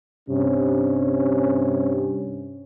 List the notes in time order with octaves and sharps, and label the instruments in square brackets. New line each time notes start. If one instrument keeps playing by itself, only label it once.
[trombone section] G2 C3 C#4